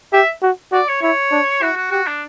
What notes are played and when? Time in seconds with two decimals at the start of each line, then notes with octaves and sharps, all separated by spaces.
0.13 G4 E5
0.42 F#4
0.72 F#4 D5
0.88 C#5
1.02 E4 C#5
1.32 D4
1.61 E4 F#4
1.77 F#4
1.91 F#4 G4
2.07 D4